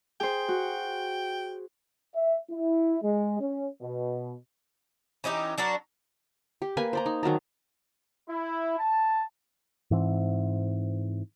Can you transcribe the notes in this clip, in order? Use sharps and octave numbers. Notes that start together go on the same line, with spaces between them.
G#4 C5 G5
F#4
E5
E4
G#3
C#4
B2
E3 C#4 D#4 G4
F#3 D4 F#4 A#4
G4
A#3 B4 G#5
C5 D5 A#5
D#4
D#3 F#3 A5 A#5
E4
A5
G#2 E3 C4